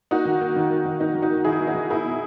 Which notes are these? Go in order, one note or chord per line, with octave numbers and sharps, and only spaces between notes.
A#3 D#4 F#4
D#3
A#3
D#3
A#3
D#3
A#3 D#4
D#3
D#4 F#4
A#3
D#3 E4 G#4
A#3
D#4 F#4
D#3
A#3 E4 G#4
B2